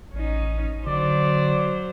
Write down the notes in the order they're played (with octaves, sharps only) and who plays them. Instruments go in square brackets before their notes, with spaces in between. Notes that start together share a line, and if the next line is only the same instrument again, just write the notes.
[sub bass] A1 [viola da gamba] C#4 D#4
[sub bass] D3 [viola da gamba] F#3 C5 [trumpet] D5